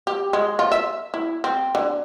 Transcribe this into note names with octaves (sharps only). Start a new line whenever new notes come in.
G4
G#3
F4
E5
E4
C4
D3